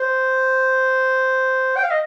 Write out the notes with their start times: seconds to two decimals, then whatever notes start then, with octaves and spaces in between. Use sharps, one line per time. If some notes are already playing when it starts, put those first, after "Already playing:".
Already playing: C5
1.76 G5
1.83 F5
1.91 D#5